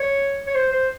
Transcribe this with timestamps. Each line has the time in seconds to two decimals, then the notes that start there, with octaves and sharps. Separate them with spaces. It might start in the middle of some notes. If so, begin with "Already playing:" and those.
Already playing: C#5
0.47 C#5
0.55 C5
0.72 C5